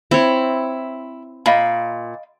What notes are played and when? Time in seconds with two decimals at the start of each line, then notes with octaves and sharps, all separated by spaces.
0.11 C4 E4 C#5
1.46 A#2 D#5 F5 B5